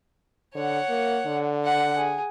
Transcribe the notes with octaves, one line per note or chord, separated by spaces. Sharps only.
D3 C#5 F#5
A#3
D3
F#5
G#4